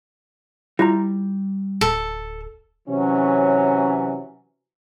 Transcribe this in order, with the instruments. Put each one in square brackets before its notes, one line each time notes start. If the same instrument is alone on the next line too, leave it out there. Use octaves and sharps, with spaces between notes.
[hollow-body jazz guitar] G3 [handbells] E4 F4 A#5
[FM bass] D1 [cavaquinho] A4
[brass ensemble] C3 E3 F#3 C#4